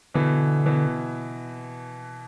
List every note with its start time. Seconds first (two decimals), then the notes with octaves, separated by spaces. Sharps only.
0.14 B2 D3 E3
0.66 B2 E3